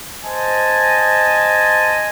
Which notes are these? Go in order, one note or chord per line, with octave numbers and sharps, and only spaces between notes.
C5 D#5 G#5 A5